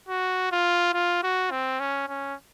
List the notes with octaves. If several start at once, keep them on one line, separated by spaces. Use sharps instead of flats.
F#4
F4
F4
F#4
C4
C#4
C#4